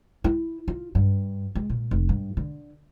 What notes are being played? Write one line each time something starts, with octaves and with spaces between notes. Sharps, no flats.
E4
F4
G2
G#3
A#2
F1
G2
D3